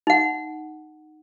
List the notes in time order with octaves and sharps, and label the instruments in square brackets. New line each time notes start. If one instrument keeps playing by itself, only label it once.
[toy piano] D#4 F#5